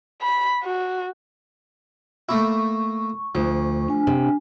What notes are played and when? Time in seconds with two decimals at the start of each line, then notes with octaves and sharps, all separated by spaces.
0.22 B5
0.64 F#4
2.29 A3 A#3 E4 C#6
3.35 D2 F3
3.88 D4 G#5
4.07 C3